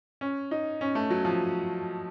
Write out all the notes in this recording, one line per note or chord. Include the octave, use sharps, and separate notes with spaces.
C#4
D#4
C#4
A3
F#3
F3